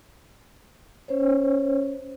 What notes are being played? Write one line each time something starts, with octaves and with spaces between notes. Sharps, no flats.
C#4 C5 C#5